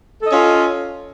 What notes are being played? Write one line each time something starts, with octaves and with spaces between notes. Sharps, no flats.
C#4 F4 A4 D#5